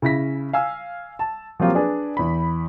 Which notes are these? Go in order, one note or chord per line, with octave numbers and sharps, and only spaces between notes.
C#3 E4 A#6 B6
F5 G#5 E6
A5
F3 F#3 A#3 C4 F4 G4
D4 G#4 B4 D5
E2 B5